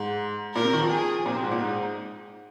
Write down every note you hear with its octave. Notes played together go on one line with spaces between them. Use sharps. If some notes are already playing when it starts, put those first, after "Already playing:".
Already playing: G#2
A#2 A#4
C3
D#3
F3
G#4
A#2 C4
C3
G#2
A#2
G#2 D#4